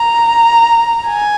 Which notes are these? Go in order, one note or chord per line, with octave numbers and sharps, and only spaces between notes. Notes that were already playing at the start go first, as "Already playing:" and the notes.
Already playing: A#5
G#5